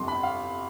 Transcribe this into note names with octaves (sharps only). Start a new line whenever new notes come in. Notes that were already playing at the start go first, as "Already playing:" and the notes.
Already playing: G1 F2 C3 C6
B5
F5